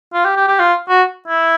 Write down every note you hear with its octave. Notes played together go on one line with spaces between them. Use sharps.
F4
G4
G4
G4
F4
F#4
E4